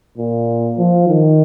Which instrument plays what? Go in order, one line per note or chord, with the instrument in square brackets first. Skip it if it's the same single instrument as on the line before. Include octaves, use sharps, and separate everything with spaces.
[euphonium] A#2
F3
D#3